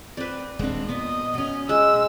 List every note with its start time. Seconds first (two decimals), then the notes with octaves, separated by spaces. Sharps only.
0.17 C4 B4 D5
0.59 D#1 G#3 C4 D4
0.89 A#2 B3 D#5
1.34 B2 C#4
1.69 G#3 E6